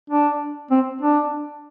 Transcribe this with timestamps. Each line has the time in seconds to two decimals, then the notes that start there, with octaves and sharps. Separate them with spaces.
0.10 D4
0.71 C4
1.01 D4